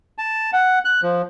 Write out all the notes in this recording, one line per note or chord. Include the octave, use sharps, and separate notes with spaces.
A5
F#5
F#6
F3